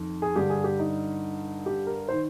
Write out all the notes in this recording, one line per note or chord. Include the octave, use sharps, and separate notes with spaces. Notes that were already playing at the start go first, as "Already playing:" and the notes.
Already playing: F2 D#3
G#4
G2 D3 G4
G#4
G4
D#4
G4
A#4
D#3 C5